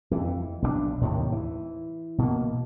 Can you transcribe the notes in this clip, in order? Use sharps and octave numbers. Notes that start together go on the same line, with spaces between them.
F2 E3
B1 F#3 D4
D#2 A2 C3 D#3
E3
B2 A#3